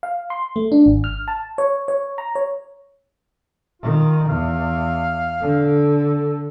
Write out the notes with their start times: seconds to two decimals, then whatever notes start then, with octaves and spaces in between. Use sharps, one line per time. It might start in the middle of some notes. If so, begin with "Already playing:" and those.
0.03 F5
0.30 C6
0.56 A3
0.72 D4
0.86 G#1
1.04 F6
1.28 A5
1.58 C#5
1.88 C#5
2.18 A#5
2.35 C#5
3.82 D#3 F4
4.29 E2 F5
5.41 D3
5.99 A4